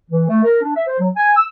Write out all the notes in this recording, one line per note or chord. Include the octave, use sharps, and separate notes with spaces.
E3
A3
A#4
D4
E5
C5
F#3
G#5
E6